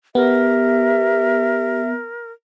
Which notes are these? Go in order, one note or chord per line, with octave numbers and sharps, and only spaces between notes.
B3 G4 A#4 E5